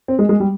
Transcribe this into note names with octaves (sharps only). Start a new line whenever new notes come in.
C4
G#3
G#3
G3